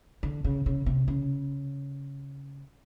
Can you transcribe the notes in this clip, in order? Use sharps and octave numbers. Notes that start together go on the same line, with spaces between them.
D3
C#3
C#3
C3
C#3